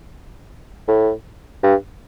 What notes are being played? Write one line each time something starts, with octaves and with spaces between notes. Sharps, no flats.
A2
G2